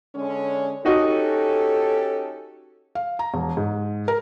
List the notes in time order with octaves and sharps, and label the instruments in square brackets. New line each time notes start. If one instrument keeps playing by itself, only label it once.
[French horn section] D3 G#3 C#4
[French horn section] C#4 G4 A4 [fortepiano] D#4 F#4 D#5
[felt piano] F5
A#5
E1
G#2
A#4